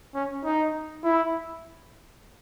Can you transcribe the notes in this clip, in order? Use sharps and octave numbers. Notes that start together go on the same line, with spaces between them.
C#4
D#4
E4